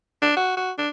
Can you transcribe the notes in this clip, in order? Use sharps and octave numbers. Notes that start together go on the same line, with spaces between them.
D4
F#4
F#4
D4